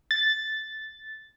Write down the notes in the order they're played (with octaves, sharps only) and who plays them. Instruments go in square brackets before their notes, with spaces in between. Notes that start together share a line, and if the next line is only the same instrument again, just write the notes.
[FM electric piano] A6